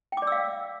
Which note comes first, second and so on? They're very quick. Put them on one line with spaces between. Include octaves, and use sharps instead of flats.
G5 D6 D5 E6 F5